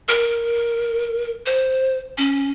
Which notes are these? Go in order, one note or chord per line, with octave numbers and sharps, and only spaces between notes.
A#4
C5
C#4